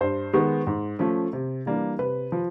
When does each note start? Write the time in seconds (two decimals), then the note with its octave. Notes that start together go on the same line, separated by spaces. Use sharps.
0.01 G2 C5
0.33 D#3 G#3 B3
0.67 G#2
0.99 F3 A3 C#4
1.33 C3
1.66 E3 G3 A#3 D4
1.99 C3 B4
2.32 F3